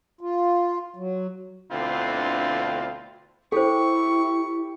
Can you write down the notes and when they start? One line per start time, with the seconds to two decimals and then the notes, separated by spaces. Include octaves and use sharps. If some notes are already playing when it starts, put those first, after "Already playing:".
0.21 F4
0.96 F#3
1.71 D2 B2 D3 C4 E4 F4
3.52 E4 G4 A4 C5 C#6